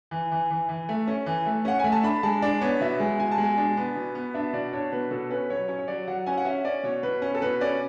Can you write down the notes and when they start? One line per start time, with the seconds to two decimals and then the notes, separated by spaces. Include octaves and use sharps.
0.11 E3
0.32 E3
0.51 E3
0.69 E3
0.89 A3
1.07 C#4
1.26 E3
1.46 A3
1.65 C#4 F#5
1.80 A3 G#5
1.92 A5
2.03 D4 B5
2.23 G#3 A5
2.42 D4 D5
2.61 B3 C#5
2.81 B2 E5
3.00 G#3
3.19 B2 G#5
3.32 A5
3.38 G#3
3.44 G#5
3.58 D4
3.77 B3
3.95 B2
4.15 B3
4.34 D4 E5
4.53 B2 D5
4.73 D4 C#5
4.92 B2 B4
5.11 B2 A4
5.30 C#4 B4
5.50 F#3 C#5
5.68 C#4 C#5
5.78 C#5
5.88 F#3 D5
6.08 F#3 F#5
6.26 C#4 G#5
6.37 F#5
6.45 C#4 E5
6.65 C#4 D5
6.84 B2 C#5
7.03 B2 B4
7.22 C#4
7.35 A4
7.42 B2 B4
7.61 C#4 D5